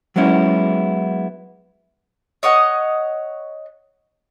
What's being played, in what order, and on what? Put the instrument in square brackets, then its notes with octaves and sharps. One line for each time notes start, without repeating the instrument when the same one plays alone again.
[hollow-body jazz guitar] F#3 G#3 B3 C#4 E4
[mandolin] C#5 D#5 F#5 D#6